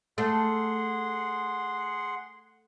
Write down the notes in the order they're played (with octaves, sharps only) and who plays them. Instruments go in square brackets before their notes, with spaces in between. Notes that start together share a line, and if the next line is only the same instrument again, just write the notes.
[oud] A3 [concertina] G#4 F#5 C6